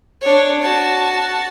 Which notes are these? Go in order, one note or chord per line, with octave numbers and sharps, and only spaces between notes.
D4 C#5
F#4 A5